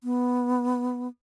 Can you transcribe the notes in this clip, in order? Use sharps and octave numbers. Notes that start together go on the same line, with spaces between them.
B3